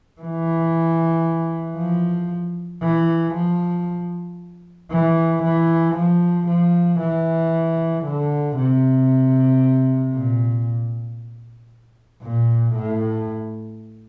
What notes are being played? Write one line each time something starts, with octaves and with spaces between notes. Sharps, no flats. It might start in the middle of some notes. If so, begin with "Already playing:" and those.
E3
F3
E3
F3
E3
E3
F3
F3
E3
D3
C3
A#2
A#2
A2